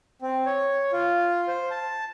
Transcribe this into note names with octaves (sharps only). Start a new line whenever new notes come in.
C4
C#5
F4
C5
A5